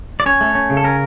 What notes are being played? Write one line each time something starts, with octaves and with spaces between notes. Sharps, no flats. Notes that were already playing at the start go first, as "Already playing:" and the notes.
D5
C#4 C#5
A3
C#4
C#3
A4
C#4 A#4